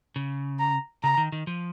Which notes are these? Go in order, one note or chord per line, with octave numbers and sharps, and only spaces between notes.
C#3
A#5
C#3 A#5
D#3
D#3
F3